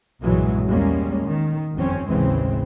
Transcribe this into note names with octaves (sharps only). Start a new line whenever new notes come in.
B1 G2 A#2 E3 F#3 G#3
E2 G3 G#3 A#3 C#4
D#3
G1 F2 C4 C#4
A1 D#2 C#3 E3 G#3 C4